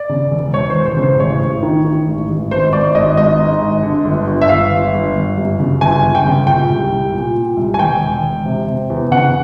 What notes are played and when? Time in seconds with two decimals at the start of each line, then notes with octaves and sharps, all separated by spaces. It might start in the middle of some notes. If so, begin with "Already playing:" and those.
Already playing: D5
0.09 C#3
0.31 E1
0.54 E1 C#5
0.70 E1 C5
0.86 C5
0.97 C#3
1.03 C5
1.20 A1 C#5
1.41 A1
1.63 D#3
1.85 D#3
2.07 A1
2.29 A1
2.51 G#1 C5
2.73 G#1 D5
2.95 G#1 D#5
3.17 G#1 D#5
3.39 G#2
3.61 G#1
3.83 D3
4.05 G1
4.27 G1
4.41 E5
4.49 G1 F5
4.71 G1
4.94 G1
5.15 G1
5.38 F#2
5.60 C#3
5.81 G1 G#5
6.03 G1
6.15 G5
6.25 C#3
6.47 A#2 G5
6.70 C2
6.92 C2
7.14 A#2
7.36 A#2
7.57 C2
7.74 G#5
7.79 E1 G5
8.01 E1
8.24 E1
8.46 C3
8.68 C3
8.90 E2
9.11 C#3 F#5